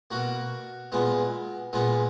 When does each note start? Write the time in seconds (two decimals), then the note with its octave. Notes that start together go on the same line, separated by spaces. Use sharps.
0.11 B2 A#3 F#4
0.92 A#2 G#3 B3
1.73 A#2 G#3 B3